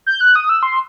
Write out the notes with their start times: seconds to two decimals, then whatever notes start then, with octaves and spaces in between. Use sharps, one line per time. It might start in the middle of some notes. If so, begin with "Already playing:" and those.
0.06 G6
0.21 F#6
0.36 D#6
0.49 E6
0.63 C6